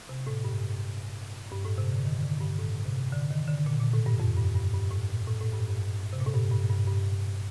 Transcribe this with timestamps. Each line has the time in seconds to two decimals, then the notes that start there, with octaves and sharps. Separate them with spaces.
0.09 C3
0.27 A2
0.45 G2
1.52 G2
1.65 A2
1.78 C3
1.92 D3
2.05 D#3
2.23 D3
2.41 G2
2.58 A2
2.86 C3
3.12 D3
3.31 D#3
3.48 D3
3.66 A#2
3.80 A#2
3.93 A2
4.06 G2
4.20 F2
4.37 G2
4.56 G2
4.73 G2
4.91 A2
5.09 A#2
5.27 A2
5.40 A2
5.54 G2
5.67 G2
6.13 C3
6.20 A#2
6.27 A2
6.34 G2
6.52 G2
6.70 G2
6.88 G2